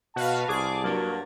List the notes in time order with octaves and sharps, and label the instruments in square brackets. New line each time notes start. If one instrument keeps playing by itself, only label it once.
[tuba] B2 [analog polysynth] F#4 B4 F5 [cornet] A5
[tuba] C2 [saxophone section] G#4 [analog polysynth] D6
[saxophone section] G2 A#3 [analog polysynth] F#3